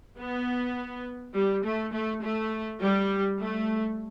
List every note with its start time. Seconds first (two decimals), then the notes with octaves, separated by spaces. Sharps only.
0.18 B3
1.34 G3
1.64 A3
1.93 A3
2.23 A3
2.80 G3
3.40 A3